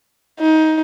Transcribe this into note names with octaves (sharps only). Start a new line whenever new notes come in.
D#4